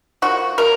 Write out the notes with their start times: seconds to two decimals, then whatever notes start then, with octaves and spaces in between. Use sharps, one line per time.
0.22 F3 A#3 F#4
0.58 C3 F#3 A#3 A#4